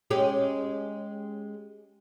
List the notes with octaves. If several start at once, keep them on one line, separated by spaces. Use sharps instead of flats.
G#3 C#4 G4